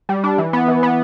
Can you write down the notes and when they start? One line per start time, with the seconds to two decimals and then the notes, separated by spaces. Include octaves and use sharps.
0.09 G3
0.24 D4
0.38 E3
0.53 B3
0.68 E3
0.83 B3